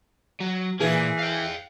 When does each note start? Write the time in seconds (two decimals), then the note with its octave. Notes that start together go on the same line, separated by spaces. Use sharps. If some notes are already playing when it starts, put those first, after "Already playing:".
0.41 F#3
0.80 A#2 E3 A#3 G#4
1.19 F5 G5